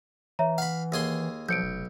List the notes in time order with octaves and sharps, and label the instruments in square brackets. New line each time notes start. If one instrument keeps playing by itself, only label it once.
[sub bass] E3 [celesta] C#5 E5 A#5
[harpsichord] F5 B5 [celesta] F#5
[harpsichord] D#2 G#4 C6
[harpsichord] B1 [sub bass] F3 [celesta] G6 C#7 D7
[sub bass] F1